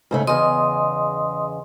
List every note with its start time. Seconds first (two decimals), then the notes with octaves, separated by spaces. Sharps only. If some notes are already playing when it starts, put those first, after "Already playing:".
0.11 G#2 C#3 A3
0.27 E2 C#3 D#5 C6 D#6